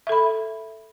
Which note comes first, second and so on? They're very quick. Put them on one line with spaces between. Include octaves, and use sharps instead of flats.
E5 A4 B5